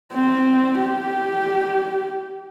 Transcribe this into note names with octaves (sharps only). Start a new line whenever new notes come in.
C4
G4